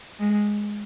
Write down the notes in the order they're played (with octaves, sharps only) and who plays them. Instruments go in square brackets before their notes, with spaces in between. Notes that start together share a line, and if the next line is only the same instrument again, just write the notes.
[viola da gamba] G#3